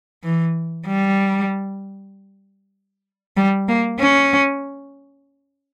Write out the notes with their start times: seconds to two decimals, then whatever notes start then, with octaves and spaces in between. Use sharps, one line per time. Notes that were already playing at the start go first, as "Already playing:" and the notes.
0.24 E3
0.87 G3
3.37 G3
3.68 A#3
3.99 C#4